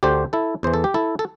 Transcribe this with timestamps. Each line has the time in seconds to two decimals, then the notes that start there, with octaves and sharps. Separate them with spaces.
0.03 D2 D3 G4 C5
0.33 E4 A4
0.63 E2 E3 C5
0.74 A4
0.84 G4
0.94 E4 A4
1.19 A4